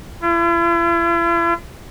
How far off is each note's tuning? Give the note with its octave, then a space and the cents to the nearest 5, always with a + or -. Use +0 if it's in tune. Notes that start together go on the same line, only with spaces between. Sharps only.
E4 +45